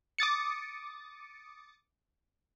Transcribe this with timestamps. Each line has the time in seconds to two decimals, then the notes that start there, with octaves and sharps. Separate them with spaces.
0.19 D6 D#6 A6 C#7